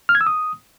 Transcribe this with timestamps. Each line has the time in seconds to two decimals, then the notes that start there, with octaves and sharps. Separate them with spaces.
0.09 F6
0.15 G#6
0.21 E6
0.27 D#6